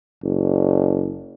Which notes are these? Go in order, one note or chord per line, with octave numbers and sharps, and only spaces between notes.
F#1